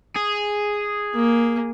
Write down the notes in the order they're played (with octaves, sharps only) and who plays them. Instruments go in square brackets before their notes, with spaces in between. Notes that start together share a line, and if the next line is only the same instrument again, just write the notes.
[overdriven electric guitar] G#4
[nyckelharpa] A#3